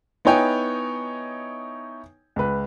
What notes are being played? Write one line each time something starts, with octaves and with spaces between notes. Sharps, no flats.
B3 D#4 E4 C#5 G5 G#5
C#2 B4